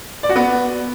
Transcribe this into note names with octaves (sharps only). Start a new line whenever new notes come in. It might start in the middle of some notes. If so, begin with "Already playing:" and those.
D5
F#4
B3